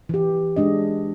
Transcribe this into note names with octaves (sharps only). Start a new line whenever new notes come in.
E3 G4
G#3 D4 D#5